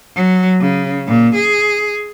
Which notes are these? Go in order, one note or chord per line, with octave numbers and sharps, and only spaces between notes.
F#3
C#3
A#2
G#4